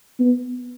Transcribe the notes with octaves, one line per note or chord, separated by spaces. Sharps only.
B3